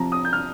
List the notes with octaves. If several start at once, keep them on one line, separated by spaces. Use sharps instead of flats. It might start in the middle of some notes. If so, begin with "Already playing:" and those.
Already playing: C3 F3 A#5
D#6
G6
F6